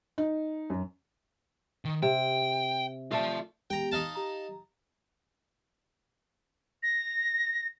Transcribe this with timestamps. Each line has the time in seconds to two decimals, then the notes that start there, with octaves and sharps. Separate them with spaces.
0.18 D#4
0.70 F#2
1.85 D#3
2.02 C3 G5
3.12 A3 F4 A4 D5 A5
3.70 G#3 B3 G4 G5 A#5
3.92 D#4 F5 A5
4.15 G4 A#5
6.83 A#6